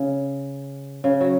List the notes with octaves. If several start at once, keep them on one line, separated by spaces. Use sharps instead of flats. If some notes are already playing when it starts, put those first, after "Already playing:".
Already playing: C#3
C#3
F#3